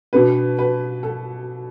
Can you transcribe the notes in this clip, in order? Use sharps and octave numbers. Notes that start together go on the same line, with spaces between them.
B2 B3 D4 B4
B4
A4